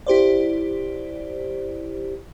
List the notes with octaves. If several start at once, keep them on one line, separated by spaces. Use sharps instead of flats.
E4 G4 C5 D5